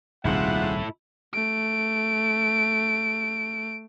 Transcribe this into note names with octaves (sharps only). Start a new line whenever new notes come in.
D#1 C2 G#2 A3 E4 F4 F#5
A3 D7